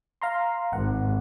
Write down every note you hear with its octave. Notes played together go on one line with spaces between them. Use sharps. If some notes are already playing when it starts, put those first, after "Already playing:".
F5 A#5 C6
G#1 F#5